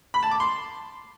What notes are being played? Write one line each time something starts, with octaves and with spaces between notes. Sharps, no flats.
B5
A5
D6
C6